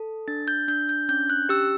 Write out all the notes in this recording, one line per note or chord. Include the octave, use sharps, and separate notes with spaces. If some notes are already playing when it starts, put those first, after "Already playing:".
Already playing: A4
D4 A6
G6
D4 G6
G6
C#4 G6
F#6
G4 E6